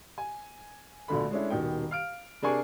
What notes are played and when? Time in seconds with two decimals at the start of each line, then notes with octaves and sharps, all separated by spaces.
0.18 G#5
1.08 A#1 B2 D3 A3 B5
1.31 G#3 A3 C#4 D4 E4
1.50 D#1 B2 D#3 G5
1.91 F5 F6 D7
2.42 C3 D4 G#4 A#4 G#5 C#6